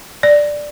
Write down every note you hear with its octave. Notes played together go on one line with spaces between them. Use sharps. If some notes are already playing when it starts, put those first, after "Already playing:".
D5